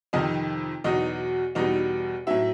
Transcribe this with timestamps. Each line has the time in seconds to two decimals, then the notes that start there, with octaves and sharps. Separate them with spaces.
0.13 F2 C3 D#3 D#4 D#5
0.84 E2 B2 F#3 D#4 D#5
1.55 E2 B2 G3 D#4 D#5
2.27 A2 F#3 E4 E5